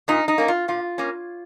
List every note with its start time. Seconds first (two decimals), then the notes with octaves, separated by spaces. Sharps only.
0.08 A#2 D#4
0.28 D#4
0.38 A#3 C#4
0.48 F4
0.68 A#2 F4
0.98 A#3 C#4